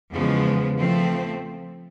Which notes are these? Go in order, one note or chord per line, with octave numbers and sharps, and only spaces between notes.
E2 C#3 F3 G#3 B3
F3 A3 C4